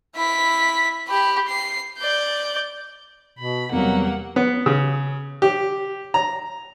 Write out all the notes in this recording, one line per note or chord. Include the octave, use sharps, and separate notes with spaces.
E4 B6
G4 B5
C7
D5 G6
B2 B5
E2 C3 F#3 G3 A#3 F#5
B3
C#3
G4
A#5